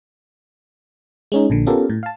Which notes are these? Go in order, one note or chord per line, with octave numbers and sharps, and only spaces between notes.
G#3 C#4 D#4
A#1 A#2 D3
B3 C#4 F4 G4 A4 A#4
A2
F5 A5